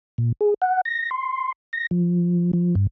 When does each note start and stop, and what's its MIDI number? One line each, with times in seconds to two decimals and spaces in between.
0.18 0.32 46
0.41 0.54 68
0.62 0.81 78
0.85 1.10 94
1.11 1.52 84
1.73 1.87 94
1.91 2.51 53
2.53 2.75 53
2.75 2.87 43